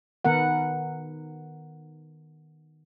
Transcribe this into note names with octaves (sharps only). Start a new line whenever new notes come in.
D#3 B3 A#4 F#5